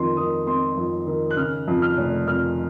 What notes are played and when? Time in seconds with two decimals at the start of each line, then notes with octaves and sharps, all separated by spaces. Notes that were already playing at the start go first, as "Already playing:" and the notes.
Already playing: F2 D#3 C6
0.17 D#3 D#6
0.47 C4 C6
0.77 F2
1.07 D#3
1.31 F#6
1.37 C#3 F6
1.67 F2
1.82 F6
1.98 F1
2.27 F2 F6